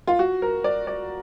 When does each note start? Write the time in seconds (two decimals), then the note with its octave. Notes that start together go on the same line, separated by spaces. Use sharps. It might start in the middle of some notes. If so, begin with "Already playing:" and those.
0.07 F4
0.19 F#4
0.42 A#4
0.64 D5
0.87 D5